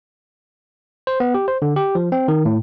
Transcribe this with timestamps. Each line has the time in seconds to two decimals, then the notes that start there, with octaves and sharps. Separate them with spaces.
1.07 C5
1.20 B3
1.34 G4
1.48 C5
1.62 D3
1.76 G4
1.95 F3
2.12 C4
2.28 D#3
2.45 A2